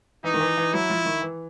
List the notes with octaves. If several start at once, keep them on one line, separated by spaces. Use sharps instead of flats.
E3 D#4
D#3
E3
E3
F#3 E4
F3
D#3
E3